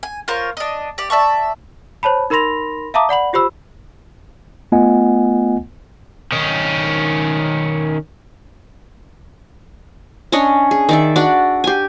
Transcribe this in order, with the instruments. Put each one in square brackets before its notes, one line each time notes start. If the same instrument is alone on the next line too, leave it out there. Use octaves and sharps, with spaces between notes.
[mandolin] G#5
F4 A#4 C5 C#5
D4 D#5
G4 D5
D5 E5 A5 C#6
[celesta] C5 C#5 A5 B5
D#4 A#4 B5 C6 A#6 F7
E5 F5 A5 A#5 D6 D#6
D5 F#5 B5 F#7
F4 G4 C5 B5 E6
[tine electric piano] A3 B3 F4 D#5 F#5 G#5
[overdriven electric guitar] D#3 C#4
[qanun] C#4 D4 C#5 D#5
G#4
D#3 D5 E5
D4 F#4 D5 F#5
G4 G#5